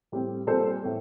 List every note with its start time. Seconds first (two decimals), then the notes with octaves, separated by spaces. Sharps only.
0.12 A2 G3 C4
0.47 A#2 G3 C4 A4 C5
0.83 A2 A3 C4